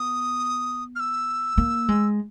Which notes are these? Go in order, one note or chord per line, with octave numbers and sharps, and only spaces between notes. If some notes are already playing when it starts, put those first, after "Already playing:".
Already playing: B3 D#6
F6
E6
A#3
G#3